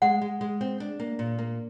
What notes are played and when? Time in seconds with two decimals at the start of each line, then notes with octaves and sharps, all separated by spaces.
0.02 G#3 F#5
0.22 G#3
0.41 G#3
0.61 C4
0.80 D4
1.00 A#3
1.19 A#2
1.39 A#3